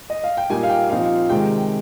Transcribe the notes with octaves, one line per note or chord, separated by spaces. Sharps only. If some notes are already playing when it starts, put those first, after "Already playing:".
D#5
F5
G5
A#2 G3 A#3 D#4 G#5
F5
G5
A#2 F3 C4 D#4 F5
C3 D#3 G#3 G5